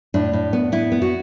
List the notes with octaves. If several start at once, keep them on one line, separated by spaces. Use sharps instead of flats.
A2 D4
A2
B3
B3 E4
B3
F#4